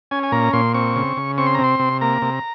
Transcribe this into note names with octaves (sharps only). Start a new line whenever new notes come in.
C#4 G#5
G#5
A#2 A#5
A#2 C6
C4 C#6
C#3
C#3
C4 C#6
C6
A#5
C3
C6
C3
A#3 A#5
C3